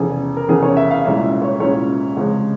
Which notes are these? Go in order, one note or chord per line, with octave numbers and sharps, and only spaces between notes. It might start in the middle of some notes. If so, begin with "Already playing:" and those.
Already playing: F1 E2 C#3 G#4
A#4
F1 E2 C#3 G#4
C#5
E5
F5
C2 A#2 G#3 C#4 E5
E5
C#5
C2 A#2 G#3 C#4 C#5
C#2 C3 F3 G#3